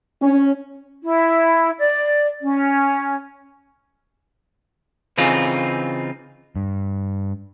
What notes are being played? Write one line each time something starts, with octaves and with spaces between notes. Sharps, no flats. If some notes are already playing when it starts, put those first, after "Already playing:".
C#4
E4
D5
C#4
C#3 E3 C4 D#4 F4 G#4
G2